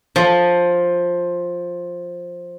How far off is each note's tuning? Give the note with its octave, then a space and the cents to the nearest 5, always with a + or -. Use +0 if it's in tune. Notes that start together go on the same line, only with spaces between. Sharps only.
F3 +10